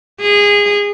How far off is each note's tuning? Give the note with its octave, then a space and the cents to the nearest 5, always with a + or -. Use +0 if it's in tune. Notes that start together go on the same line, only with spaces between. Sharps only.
G#4 -20